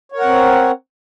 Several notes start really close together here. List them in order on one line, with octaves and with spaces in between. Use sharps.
C#5 A#4 F#5 C4